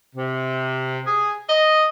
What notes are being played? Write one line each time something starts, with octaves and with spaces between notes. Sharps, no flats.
C3
G#4
D#5